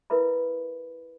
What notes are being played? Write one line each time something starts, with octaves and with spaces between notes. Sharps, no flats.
E4 A#4 B4 E5 B5